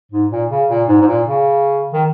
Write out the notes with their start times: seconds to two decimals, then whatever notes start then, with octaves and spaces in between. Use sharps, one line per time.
0.12 G#2
0.31 A#2
0.50 C#3
0.69 A#2
0.88 G#2
1.01 G#2
1.07 A#2
1.26 C#3
1.94 D#3